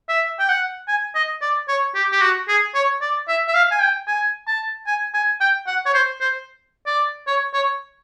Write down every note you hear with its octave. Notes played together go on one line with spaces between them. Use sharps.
E5
G5
F#5
G#5
D#5
D5
C#5
G4
G4
F#4
G#4
C#5
D5
E5
E5
F5
G#5
G5
G#5
A5
G#5
G#5
G5
F#5
C#5
C5
C5
D5
C#5
C#5